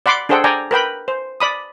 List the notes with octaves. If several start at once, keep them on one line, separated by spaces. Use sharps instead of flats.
D5 F#5 B5 C6 D6
D4 G#4 A4 C5 F#5 G5
D5 G5 G#5 A#5
A#4 B4 G5 B5
C5
D5 B5 D#6